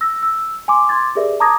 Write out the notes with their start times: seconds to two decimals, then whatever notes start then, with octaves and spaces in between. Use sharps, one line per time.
0.01 E6 A#6
0.23 E6
0.68 G#5 C6 D6
0.89 C6 D6 G#6 A6
1.15 G4 G#4 A#4 B4 D5 E5
1.40 A5 A#5 D6 D#6 G#6 A#6